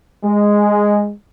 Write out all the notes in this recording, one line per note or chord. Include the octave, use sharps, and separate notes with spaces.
G#3